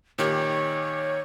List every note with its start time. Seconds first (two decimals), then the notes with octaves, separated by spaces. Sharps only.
0.18 A#2 D#3 G4 C#5